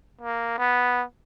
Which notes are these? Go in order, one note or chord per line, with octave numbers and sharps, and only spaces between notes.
A#3
B3